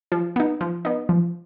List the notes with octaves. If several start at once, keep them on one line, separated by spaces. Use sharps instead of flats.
F3
B3 D#4
F3
B3 D#4
F3